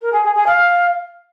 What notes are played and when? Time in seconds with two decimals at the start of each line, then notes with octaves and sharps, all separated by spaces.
0.01 A#4
0.12 G#4
0.23 G#4
0.35 G#4
0.46 F5